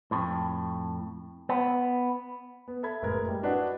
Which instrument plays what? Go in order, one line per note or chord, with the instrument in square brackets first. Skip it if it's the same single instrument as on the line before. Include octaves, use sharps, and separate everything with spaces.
[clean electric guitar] F2 A2
B3
[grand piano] B3
A4 E5 B5 G#6
F#1 A2 G#3 A#4 B4 G#6
G3
D4 E4 F#4 B4 D#5 F#5